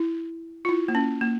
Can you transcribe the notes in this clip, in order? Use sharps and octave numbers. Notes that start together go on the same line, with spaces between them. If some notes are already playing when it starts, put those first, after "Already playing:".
Already playing: E4
F4
E4
A#3
C#4
A#3